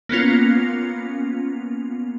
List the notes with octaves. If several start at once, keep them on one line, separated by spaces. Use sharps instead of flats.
A#3 B3 C#4 F4